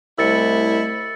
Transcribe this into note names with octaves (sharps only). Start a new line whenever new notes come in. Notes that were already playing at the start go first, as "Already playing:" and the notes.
C2 G3 A3 E4 D#5 E6 A6 C#7